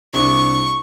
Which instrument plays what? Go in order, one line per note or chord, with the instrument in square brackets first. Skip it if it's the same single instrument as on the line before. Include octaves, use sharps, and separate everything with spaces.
[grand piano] C2 C3 D4 [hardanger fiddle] C#6